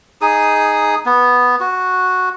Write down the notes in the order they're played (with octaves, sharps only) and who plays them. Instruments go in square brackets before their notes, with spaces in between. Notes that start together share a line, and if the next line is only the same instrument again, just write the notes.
[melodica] D#4 G#4 D#6
B3
F#4